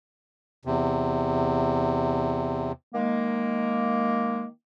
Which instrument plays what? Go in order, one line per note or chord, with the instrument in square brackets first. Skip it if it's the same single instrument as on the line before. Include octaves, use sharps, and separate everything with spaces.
[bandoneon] E2 C3
[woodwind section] D#3 G#3 A#3